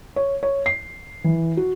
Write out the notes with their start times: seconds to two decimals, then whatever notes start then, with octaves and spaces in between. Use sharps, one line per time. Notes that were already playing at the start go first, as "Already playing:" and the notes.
0.16 C#5
0.43 C#5
0.66 C7
1.24 E3
1.57 F#4